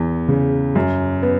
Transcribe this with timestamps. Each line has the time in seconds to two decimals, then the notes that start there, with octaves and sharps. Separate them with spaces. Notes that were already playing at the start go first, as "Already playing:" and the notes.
Already playing: E2
0.28 C#3
0.75 F#2
1.23 B3